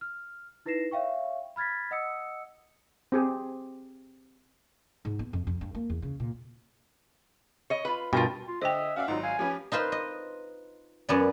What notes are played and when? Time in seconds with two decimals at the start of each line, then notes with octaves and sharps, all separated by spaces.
0.01 F6
0.66 D#4 E4 B4 A#6 C7 E7
0.91 C#5 E5 F5 G5 C#6
1.56 B5 F6 G#6 A6 B6
1.91 D#5 F#5 D#6 E6 C#7
3.12 C4 G4 G#4
5.05 G#2
5.19 B3
5.33 F2
5.47 F2
5.61 G2
5.75 A#3
5.90 E2
6.02 C#3
6.20 A#2
7.70 C#5 D#5
7.85 F4 B4
8.13 G2 B2 F4 A#4 G5
8.47 F4
8.62 D3 C5 D#5 E5 G5
8.96 C#4 F#4 D5 E5 F5
9.08 G#1 F#3 D#4 F4
9.23 F5 G#5
9.39 F3 C#4 G4 B4
9.72 D#4 F4 B4 C5
9.92 D#5
11.09 F#2 B3 D5